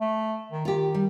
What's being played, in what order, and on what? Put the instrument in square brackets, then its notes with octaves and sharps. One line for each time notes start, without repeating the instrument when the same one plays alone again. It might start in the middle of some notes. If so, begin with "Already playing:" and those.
[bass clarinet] A3
D#3
[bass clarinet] D#3 [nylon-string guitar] F4 G4
[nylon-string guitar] G3